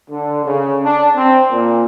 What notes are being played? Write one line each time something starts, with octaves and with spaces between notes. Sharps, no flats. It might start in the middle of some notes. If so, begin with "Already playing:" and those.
D3
C#3
D4
C4
A#2